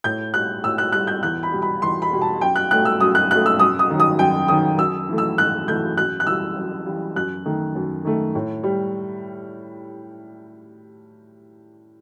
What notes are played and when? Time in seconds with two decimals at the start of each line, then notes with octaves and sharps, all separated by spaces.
0.04 A2 G6
0.34 G3 F#6
0.64 A2 E6
0.78 F#6
0.92 G3 F#6
1.07 G6
1.23 E2 F#6
1.43 B5
1.52 B2 G3
1.62 B5
1.82 E2 C6
2.02 B5
2.11 B2 G3
2.21 A5
2.41 F#2 G5
2.56 F#6
2.71 F#3 A3 F#6
2.85 E6
3.00 F#2 D#6
3.15 F#6
3.31 F#3 A3 F#6
3.46 E6
3.59 F#2 D#6
3.79 D#6
3.90 D#3 F#3
4.00 D#6
4.19 F#2 G5
4.48 D#3 F#3 D#6
4.78 F#2 E6
5.09 E3 A3
5.18 E6
5.37 F#2 F#6
5.67 E3 A3 G6
5.97 F#2 F#6
6.20 F#6
6.27 E3 G3 E6
6.56 F#2
6.86 E3 G3
7.16 F#2 F#6
7.46 D#3 A3
7.75 F#2
8.05 D#3 A3
8.35 A2
8.63 G3